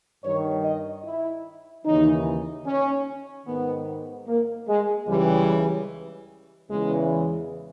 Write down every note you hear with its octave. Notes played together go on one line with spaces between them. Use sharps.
G2 D#3 C#5
D#5
E4
D#2 C#3 E3 D#4
C#4
G#2 D#3 B3
A#3
G#3
C#2 C#3 E3 G3
E2 C#3 E3 G#3